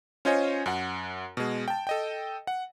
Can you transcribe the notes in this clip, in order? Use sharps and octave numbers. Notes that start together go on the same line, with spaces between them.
C#4 F4 C5 C#5 D#5 G#5
F#2 F#5
B2 G#3
G5 A5
A4 D#5 G5
F#5